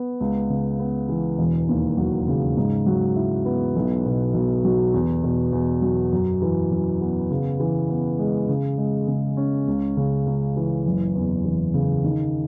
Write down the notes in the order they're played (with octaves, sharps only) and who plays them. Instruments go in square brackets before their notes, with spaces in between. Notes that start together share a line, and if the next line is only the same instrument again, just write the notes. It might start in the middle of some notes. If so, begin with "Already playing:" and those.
Already playing: [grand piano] B3
C#2
C#3
B3
E3
E1
D#2
F#3
C#3
G#2
F#3
E4
B3
B1
B2
B1
F#3
E2
B2
E2
F#3
F#2
E3
F#2
B3
C#3
E3
B3
G#3
C#3
G#3
C#3
C#4
C#2
C#3
C#2
E3
F#1
E2
E3
C#3
D#3